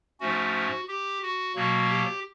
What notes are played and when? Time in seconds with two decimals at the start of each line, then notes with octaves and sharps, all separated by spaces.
0.20 G#2 F3 A3 C#4 F#4
0.88 G4
1.23 F#4
1.55 B2 F#3 A#3 F#4
1.89 G4